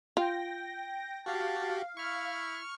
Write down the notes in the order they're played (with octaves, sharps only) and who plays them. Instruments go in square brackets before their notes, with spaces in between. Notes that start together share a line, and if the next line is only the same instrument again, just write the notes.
[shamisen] F4 [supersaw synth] G5 A#6
[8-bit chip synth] F#4 G4 [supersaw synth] F5 [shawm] A5
[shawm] E4 [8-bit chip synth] C#6 F6